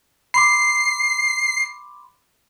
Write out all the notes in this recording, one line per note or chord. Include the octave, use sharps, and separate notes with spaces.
B5 C6 D6 C7